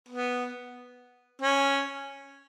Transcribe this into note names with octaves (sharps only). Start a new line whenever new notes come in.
B3
C#4